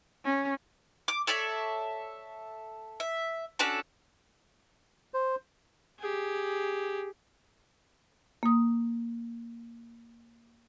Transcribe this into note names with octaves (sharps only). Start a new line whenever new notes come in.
C#4
D6
A4 C#5 D5 E5
E5
C#4 D4 F#4 A4
C5
G4 G#4
A#3 D#6